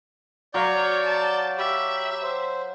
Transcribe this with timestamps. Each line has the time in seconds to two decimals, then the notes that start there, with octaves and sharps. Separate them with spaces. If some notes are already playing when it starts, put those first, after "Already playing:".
0.54 F#3 C#5 D5 F5 G6
1.05 A5
1.58 G4 E5 B5
2.23 C5